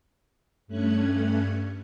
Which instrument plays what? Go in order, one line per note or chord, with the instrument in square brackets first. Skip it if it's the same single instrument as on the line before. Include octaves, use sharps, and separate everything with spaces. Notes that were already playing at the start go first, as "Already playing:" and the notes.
[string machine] G2 A3 C#4 F#6 G#6